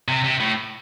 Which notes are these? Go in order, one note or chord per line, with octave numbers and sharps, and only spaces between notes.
C3
C3
A2